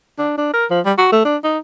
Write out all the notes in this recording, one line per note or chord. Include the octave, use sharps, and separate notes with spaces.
D4
D4
A#4
F3
G3
F#4
A3
D4
D#4